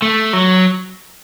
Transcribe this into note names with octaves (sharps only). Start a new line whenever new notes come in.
A3
F#3